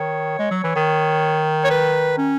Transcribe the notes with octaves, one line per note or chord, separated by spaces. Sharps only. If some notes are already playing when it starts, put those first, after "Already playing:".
Already playing: D#3 C#5
G#3
F#3
E3
D#3
C#5
B4
C#4